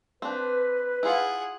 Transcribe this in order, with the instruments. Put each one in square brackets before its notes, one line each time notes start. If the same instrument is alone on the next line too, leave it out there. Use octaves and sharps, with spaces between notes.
[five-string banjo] C4 D4 [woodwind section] B4
[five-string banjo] E4 F4 [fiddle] G#4 F#5